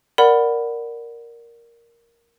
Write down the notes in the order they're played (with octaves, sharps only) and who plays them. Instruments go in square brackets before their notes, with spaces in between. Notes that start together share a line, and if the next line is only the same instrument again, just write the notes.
[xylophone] A#4 D5 F#5 B5